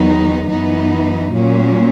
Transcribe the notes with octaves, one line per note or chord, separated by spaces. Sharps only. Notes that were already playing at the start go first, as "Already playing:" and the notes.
Already playing: E2 D#3 F#3 B3 D#4
F#2 E3 B3 D#4
A#2 F#3 A#3 C#4